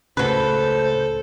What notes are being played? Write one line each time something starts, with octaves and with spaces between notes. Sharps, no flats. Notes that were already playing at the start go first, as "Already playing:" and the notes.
C#2 A2 C#3 F#3 A4 B4 C5